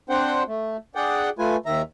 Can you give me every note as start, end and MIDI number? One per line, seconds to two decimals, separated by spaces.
0.10 0.43 60
0.10 0.43 62
0.10 0.43 72
0.10 0.43 78
0.10 0.43 79
0.48 0.77 57
0.95 1.30 62
0.95 1.30 68
0.95 1.30 74
0.95 1.30 78
0.95 1.30 79
1.39 1.56 57
1.39 1.56 65
1.39 1.56 71
1.39 1.56 80
1.66 1.82 39
1.66 1.82 51
1.66 1.82 76
1.66 1.82 82